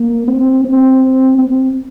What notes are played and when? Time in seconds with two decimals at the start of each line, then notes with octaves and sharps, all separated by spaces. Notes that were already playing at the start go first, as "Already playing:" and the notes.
Already playing: A#3
0.28 C4
0.64 C4
1.38 C4